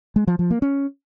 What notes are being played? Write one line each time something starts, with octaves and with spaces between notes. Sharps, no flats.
G#3
F3
F3
A#3
C#4